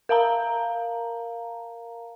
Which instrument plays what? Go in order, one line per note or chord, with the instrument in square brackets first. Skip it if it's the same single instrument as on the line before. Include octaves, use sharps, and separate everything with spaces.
[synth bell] A#4 F5 A5 A#5